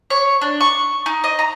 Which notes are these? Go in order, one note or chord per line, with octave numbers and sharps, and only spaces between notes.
C#5
D4
C#6
D#4
D#5
A#5